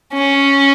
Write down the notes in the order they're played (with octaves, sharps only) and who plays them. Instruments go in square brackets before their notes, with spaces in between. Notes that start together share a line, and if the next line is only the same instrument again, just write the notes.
[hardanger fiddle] C#4